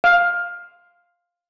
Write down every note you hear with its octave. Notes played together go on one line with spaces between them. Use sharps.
F5